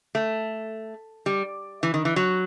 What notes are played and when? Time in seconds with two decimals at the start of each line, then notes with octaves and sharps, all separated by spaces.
0.15 A3
1.26 G3
1.83 E3
1.94 D#3
2.05 E3
2.16 F#3